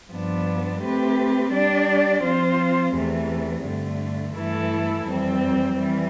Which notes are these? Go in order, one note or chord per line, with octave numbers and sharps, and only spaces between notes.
G2 F3 B3 D4
A3 C4 G4 B4
G3 D4 G4 D5
F3 C4 F4 C5
E2 C3 E3 A3
G2 D3 A3
G2 E3 A3 E4 A4
F2 E3 G3 C4
E3 G3